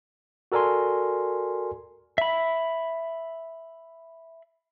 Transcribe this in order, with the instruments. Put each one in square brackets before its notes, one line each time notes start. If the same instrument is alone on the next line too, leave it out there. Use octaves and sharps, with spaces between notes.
[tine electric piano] F#4 A4 A#4 D5 G#5 C6
[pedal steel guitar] E5 B5